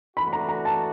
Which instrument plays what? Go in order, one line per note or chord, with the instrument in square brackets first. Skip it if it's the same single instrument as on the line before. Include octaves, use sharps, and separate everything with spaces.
[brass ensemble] E3 A3 D4 F#4 [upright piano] B5
[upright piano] A#5
A#5
A5